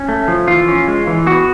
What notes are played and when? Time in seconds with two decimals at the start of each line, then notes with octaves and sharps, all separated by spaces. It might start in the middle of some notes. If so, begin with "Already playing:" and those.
Already playing: C#4
0.09 A3
0.28 F3
0.48 E3 F4
0.68 C#4
0.88 G#3
1.07 E3
1.27 B3 F#4